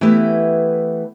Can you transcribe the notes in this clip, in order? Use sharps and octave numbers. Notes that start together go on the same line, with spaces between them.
E3 A3 B3 E4 G4 B4